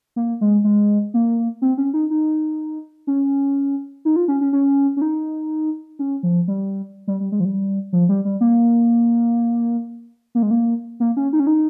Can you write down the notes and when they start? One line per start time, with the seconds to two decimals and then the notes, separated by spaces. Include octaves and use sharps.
0.16 A#3
0.41 G#3
0.64 G#3
1.14 A#3
1.62 C4
1.78 C#4
1.94 D#4
2.10 D#4
3.07 C#4
4.05 D#4
4.16 F4
4.28 C#4
4.41 C#4
4.53 C#4
4.97 C#4
5.02 D#4
5.99 C#4
6.23 F3
6.48 G3
7.08 G3
7.20 G3
7.32 G#3
7.40 F3
7.45 G3
7.93 F3
8.09 G3
8.25 G3
8.41 A#3
10.35 A#3
10.42 G#3
10.51 A#3
11.00 A#3
11.17 C#4
11.33 D#4
11.40 C#4
11.47 D#4